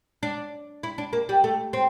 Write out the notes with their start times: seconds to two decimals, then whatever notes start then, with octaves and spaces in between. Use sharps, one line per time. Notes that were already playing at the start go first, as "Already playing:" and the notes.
0.23 D4
0.83 E4
0.98 D4
1.13 A#3
1.29 G3
1.44 A3
1.73 C4